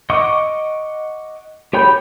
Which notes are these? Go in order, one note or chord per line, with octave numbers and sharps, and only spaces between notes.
D#5 F#5 C#6 D6
G4 C#5 G5 B5 G6